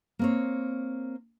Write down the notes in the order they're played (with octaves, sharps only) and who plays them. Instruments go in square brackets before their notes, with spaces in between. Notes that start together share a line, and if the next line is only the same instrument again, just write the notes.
[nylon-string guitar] A#3 C4 C#5